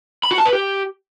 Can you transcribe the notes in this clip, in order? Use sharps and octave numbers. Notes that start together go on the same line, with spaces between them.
B5
F#4
A5
B4
G4